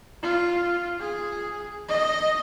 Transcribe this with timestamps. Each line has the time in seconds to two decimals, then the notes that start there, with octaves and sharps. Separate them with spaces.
0.22 F4
1.00 G#4
1.89 D#5